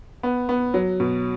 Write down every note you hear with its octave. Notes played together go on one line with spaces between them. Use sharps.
B3
B3
F#3
B2